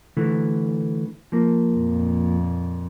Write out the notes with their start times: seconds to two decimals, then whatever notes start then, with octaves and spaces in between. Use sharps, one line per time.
0.17 D3 E3 A3
1.32 F3 A#3
1.74 F2 A#2